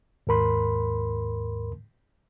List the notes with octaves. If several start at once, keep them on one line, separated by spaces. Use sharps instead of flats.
D#2 G#2 A#4 B5 C6